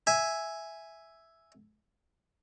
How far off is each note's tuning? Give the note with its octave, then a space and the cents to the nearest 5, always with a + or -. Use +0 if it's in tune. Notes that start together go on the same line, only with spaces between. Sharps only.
E5 +0 G#5 +0